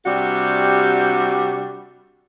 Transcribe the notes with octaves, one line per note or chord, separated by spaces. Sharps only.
C3 G3 D4 F#4 G4